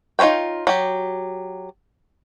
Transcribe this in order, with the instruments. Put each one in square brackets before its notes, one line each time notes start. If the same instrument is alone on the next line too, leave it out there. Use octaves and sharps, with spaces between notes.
[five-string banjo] D#4 F4 C5 C#5 G5
F#3 G4